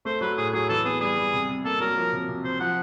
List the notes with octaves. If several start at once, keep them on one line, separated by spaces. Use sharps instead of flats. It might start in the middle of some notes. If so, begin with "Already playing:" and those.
A3 C5
F#3 B4
A2 G#4
F#3 G#4
E3 A4
B3 G#4
G3 G#4
G3
C3
C3
A#3 A4
F#3 A#4
F3
C3
C3
C3 C5
F3 F#5